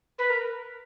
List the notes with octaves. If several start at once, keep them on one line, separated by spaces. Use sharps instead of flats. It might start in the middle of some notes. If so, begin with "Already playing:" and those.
B4
A#4